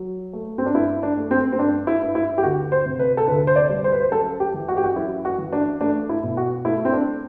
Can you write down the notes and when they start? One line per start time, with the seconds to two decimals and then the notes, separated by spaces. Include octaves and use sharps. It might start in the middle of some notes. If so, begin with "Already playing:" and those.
Already playing: F#3
0.33 A3
0.58 C4
0.66 D4
0.74 G2 E4
1.03 D4
1.17 A3
1.31 C4
1.52 C4
1.59 G2 D4
1.87 E4
2.01 G2
2.15 E4
2.38 G4
2.43 D2 F#4
2.72 C5
2.86 C3
2.99 B4
3.17 A4
3.28 D2 B4
3.47 C5
3.56 D5
3.69 G3
3.84 C5
3.92 B4
4.01 C5
4.12 F#2 A4
4.40 G4
4.54 E3
4.68 F#4
4.77 G4
4.84 F#4
4.96 F#2 E4
5.25 F#4
5.38 E3
5.52 D4
5.81 A3 D4
6.09 E4
6.23 B2
6.37 F#4
6.65 A3 E4
6.85 C4
6.93 D4